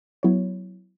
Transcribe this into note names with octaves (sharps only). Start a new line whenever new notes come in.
F#3 B3 E4 C#5